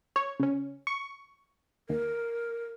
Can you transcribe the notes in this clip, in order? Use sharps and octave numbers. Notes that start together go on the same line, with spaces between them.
C#5
C#3 C#4
C#6
D#2 A#4